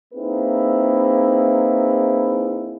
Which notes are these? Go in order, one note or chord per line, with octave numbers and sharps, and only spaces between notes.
A#3 C4 D#4 E4 G#4 B4